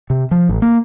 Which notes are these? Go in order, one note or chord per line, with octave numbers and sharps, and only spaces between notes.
C3
F3
A1
A#3